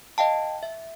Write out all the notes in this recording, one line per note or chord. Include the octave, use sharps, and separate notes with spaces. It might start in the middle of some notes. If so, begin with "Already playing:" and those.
D#5 F5 G5 A5
E5